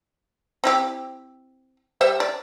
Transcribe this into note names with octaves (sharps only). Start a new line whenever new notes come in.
C4 E4 G4
G3 C5 E5
D5